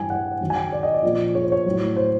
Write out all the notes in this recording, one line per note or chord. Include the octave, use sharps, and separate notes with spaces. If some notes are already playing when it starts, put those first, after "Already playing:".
Already playing: G2 E3 G5 G#5
F#5
F#2 D#3 F#3
G#5
G5
D5
D#5
D5
A#2 F3
C#5
C5
C#5
A2 F#3
C5